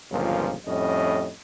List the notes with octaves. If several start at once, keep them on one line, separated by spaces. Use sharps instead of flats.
G1 C#2 A#2 D#3 F3
F2 A2 G3 C#4 D#5